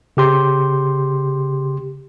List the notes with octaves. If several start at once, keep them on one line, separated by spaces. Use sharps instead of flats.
C#3 G4 C6